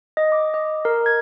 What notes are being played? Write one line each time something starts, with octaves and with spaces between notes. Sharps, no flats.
D#5
D6
D#5
A#4
G#6